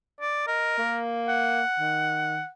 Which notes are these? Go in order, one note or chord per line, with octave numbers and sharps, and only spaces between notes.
D5
A#4 D#5
A#3
F#5
D#3